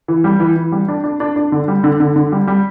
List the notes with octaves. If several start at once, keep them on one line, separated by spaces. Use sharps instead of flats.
E3
G3
E3
E3
G3
D4
D4
D4
D4
D3
G3
D3
D3
D3
G3
G3